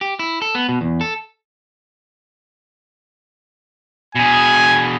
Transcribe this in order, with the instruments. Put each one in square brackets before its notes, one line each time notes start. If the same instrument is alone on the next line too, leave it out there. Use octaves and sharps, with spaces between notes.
[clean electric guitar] G4
E4
A4
B3
B2
E2
A4
[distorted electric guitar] B2 G#4 [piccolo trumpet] G#5